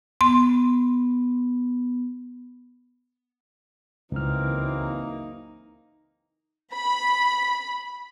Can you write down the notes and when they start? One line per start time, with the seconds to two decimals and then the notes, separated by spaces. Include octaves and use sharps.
0.21 B3 C6
4.12 F#1 C#2 E3 A#3 C4 D#4 F6
6.72 B5